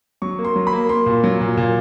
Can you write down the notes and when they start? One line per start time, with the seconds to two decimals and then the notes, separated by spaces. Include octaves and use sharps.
0.22 F#3 C#6
0.39 A#3
0.45 C6
0.56 F#3
0.67 B5
0.73 A#3
0.89 A#3 C6
1.06 A#2
1.24 F#3
1.41 A#2
1.57 A#2